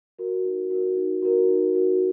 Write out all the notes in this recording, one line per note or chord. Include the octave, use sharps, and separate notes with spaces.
F#4 A#4
D#4
F#4 A#4
D#4
F#4 A#4
D#4
F#4 A#4